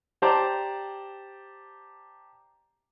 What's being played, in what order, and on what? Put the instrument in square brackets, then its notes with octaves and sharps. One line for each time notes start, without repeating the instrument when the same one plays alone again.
[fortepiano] G4 C5 D5 A5 A#5 D6